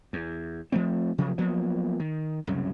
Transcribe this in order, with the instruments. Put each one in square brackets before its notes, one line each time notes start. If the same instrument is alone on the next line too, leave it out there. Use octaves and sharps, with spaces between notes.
[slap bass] E2
F3 A3 C4
C3 F3 F#3
F3 F#3 A#3 B3
D#3
C2 F#2 C#3